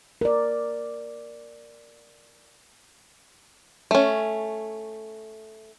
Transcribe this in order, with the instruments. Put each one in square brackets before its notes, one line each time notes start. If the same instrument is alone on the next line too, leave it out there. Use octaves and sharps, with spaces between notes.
[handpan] A#4 D5
[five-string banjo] A3 C#4